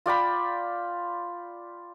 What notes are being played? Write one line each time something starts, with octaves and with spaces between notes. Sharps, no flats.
F4 D5 G5 B5